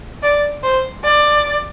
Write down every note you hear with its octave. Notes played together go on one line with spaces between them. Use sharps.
D5
C5
D5